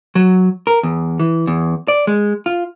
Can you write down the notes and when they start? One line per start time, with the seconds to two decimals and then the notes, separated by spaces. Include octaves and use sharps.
0.15 F#3
0.67 A#4
0.83 E2
1.19 E3
1.47 E2
1.88 D5
2.07 G#3
2.46 F4